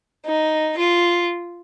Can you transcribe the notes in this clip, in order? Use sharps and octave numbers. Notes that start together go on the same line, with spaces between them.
D#4
F4